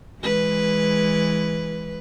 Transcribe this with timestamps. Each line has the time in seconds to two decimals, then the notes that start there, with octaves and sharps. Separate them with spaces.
0.19 E3 G#3 B4